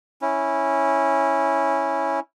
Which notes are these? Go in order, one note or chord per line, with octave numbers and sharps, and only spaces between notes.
C#4 E4